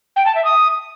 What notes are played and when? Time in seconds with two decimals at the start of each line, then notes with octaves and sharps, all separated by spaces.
0.16 G5
0.26 A5
0.35 E5
0.45 D#6